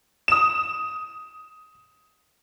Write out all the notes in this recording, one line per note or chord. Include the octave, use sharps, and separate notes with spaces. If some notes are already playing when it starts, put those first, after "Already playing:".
D#6 E7